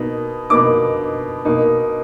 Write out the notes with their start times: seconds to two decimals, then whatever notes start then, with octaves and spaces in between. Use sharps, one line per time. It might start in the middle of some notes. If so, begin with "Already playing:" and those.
Already playing: B2 A#3 D#4
0.50 B2 A#3 D#4 D6
1.45 B2 A#3 D#4